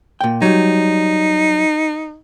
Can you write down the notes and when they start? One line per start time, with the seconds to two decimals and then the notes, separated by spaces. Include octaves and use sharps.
0.21 A#2 G5
0.42 F#3 G3 D#4